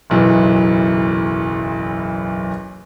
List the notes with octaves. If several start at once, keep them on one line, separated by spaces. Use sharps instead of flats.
F#1 B1 E2 E3